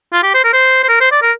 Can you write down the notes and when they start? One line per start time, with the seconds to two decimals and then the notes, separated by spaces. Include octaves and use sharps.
0.12 F4
0.23 G4
0.34 C5
0.44 A#4
0.53 C5
0.84 C5
0.89 A#4
1.01 C5
1.12 D5
1.22 A#4